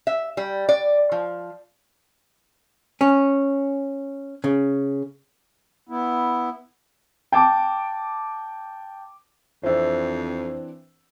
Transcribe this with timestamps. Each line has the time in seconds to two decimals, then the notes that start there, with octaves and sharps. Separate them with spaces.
0.07 E5
0.37 G3
0.69 D5
1.12 F3
3.01 C#4
4.44 C#3
5.89 B3 E4
7.32 G5 A5 D6
9.63 F2 E3 C4 D4 C5 E5